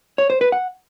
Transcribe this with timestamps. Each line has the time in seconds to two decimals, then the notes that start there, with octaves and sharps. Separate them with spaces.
0.18 C#5
0.30 C5
0.41 B4
0.52 F#5